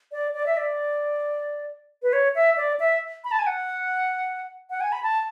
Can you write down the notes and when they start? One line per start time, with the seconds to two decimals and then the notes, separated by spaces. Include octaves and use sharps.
0.12 D5
0.34 D5
0.46 E5
0.57 D5
2.03 B4
2.13 C#5
2.35 E5
2.57 D5
2.80 E5
3.24 B5
3.31 A5
3.39 G#5
3.47 F#5
4.70 F#5
4.81 G#5
4.92 B5
5.03 A5